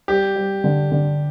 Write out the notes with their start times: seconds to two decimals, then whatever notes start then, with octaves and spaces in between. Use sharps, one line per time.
0.08 G3 G4
0.36 G3
0.64 D3
0.92 D3